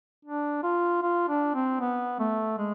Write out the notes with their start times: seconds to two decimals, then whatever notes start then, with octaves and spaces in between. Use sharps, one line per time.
0.25 D4
0.63 F4
1.03 F4
1.28 D4
1.55 C4
1.80 B3
2.19 A3
2.58 G#3